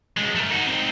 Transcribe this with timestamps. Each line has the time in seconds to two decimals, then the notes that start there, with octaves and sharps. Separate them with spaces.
0.17 F#2 G#3
0.35 A3 A#4
0.50 D#4 F#4
0.66 C4 D#4